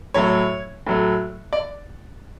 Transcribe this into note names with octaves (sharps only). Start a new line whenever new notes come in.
A2 F#3 A3 C#5
A2 F#3 A3
D5